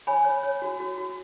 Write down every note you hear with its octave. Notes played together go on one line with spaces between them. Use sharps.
C#5 G#5 B5
C#5
C#5
F#4
F#4
F#4